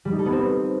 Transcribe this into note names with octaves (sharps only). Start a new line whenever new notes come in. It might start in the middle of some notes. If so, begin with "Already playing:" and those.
G3
D#4
A4
B3
C4